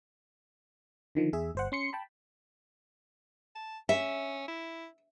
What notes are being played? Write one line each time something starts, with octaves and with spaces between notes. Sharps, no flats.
D3 D#3 F3
E2 G#4 E5
G1 C5 F#5
C#4 C6 C#7
G5 A5 B5
A5
C#4 E5
E4